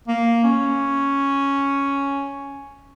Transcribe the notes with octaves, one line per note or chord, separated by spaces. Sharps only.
A#3
C#4